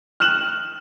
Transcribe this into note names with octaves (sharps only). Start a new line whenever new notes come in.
F6 F#6 E7 F#7